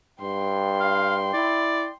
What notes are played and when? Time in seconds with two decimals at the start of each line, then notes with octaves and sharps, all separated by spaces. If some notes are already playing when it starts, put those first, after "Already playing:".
0.21 G2 G5 C6
0.80 F5
1.34 E4 D5